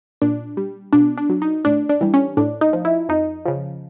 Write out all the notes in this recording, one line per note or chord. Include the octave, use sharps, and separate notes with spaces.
A#2 D4
G3
B2 D4
D4
F#3
D#4
A2 D4
D4
E3 G3
C#4
A2 D4
D#4
F3
E4
F2 D#4
C#3 F3